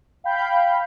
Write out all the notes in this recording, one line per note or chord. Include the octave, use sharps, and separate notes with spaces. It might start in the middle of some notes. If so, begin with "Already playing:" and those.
F5 G5 B5 G6